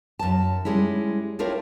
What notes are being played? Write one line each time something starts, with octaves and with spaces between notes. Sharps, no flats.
F#2 A5
G3 G#3 C#4 E4
C4 D4 E4 F4 A#4 C#5